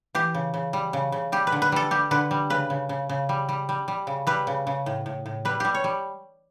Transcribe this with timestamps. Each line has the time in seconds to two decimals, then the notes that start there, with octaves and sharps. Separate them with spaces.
0.15 E3 G4
0.34 C#3
0.54 C#3
0.73 G3
0.93 C#3
1.12 C#3
1.32 G3 G4
1.47 B4
1.52 D3
1.62 B4
1.72 G3 A4
1.91 G3 G4
2.11 D3 B4
2.31 G3
2.50 C#3 B4
2.70 C#3
2.89 C#3
3.09 C#3
3.29 G3
3.49 G3
3.69 G3
3.88 G3
4.07 C#3
4.27 G3 B4
4.47 C#3
4.67 C#3
4.86 A2
5.06 A2
5.26 A2
5.45 G3 B4
5.60 G3 G4
5.74 C#5
5.84 G3